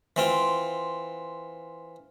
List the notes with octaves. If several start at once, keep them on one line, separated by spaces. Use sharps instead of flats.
E3 C4 F4